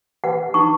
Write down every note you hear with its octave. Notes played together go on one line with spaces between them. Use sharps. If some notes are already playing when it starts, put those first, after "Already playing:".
B4 F#5
D#4 C#6